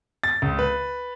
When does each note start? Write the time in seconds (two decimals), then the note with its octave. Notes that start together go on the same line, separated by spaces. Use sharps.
0.24 A6
0.42 C#2
0.59 B4